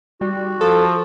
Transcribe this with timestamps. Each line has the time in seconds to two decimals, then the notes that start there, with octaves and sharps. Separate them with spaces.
0.21 G3 F#4
0.61 F3 A4